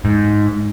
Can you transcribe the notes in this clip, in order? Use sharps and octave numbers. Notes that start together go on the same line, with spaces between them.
G#2